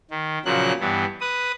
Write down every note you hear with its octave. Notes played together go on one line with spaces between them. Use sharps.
D#3
A#2 C#3 F3 F#3 F#6
G2 E3 B3
B4 D#6